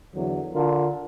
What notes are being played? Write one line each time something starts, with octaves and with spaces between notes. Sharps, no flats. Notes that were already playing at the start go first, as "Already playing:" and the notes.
E2 D3 F#3
D3 F4 A#4